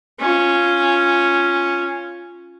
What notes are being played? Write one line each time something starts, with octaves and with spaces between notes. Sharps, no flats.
C#4 F4